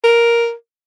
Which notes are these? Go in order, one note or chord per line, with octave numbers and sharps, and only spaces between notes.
A#4